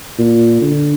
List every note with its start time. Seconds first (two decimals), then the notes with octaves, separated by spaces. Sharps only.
0.19 A#2
0.61 D3